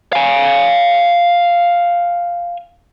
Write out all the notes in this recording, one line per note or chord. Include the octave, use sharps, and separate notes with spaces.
F5 G#5